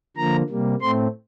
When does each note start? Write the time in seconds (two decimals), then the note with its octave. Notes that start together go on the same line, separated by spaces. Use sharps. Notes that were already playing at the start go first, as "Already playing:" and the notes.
0.17 D3 F3 A#3 A#5
0.49 C3 G3 A#3
0.82 A2 A3 C4 C6